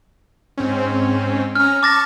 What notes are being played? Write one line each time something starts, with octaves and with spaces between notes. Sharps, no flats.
G#2 C4 C#4
C#4 A#5 F6
A5 C#6 D6 A6 A#6